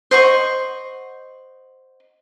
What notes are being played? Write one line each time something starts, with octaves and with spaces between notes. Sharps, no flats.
C5 D#5 F#5 C#6